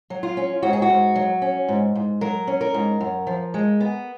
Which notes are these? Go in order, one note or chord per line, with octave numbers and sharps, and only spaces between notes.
F#3
F4
C#4
G#2 F#4
G#4
F#4
G#2
F#3
C#4
G#2
G#2
F#3 A#4
C#4
A#4
G#2
F#2
F3
G#3
B3